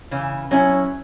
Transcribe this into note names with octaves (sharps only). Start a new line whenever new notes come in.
C#3 E3
F#3 C#4 E4